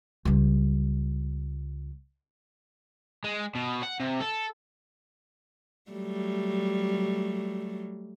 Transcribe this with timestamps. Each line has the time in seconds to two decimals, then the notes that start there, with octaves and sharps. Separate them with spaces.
0.25 C#2 G3
3.24 G#3
3.55 B2
3.83 F#5
4.00 C3
4.21 A4
5.91 F#3 G3 A3